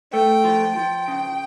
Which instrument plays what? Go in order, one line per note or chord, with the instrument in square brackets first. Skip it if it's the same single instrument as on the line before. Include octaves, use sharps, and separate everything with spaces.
[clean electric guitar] A3 [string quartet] G5
[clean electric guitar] F3
[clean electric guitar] F3 [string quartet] G5
[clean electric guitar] C#3